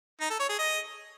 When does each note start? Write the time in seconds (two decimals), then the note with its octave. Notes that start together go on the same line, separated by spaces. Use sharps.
0.20 D#4
0.30 A4
0.40 C#5
0.49 G#4
0.59 D#5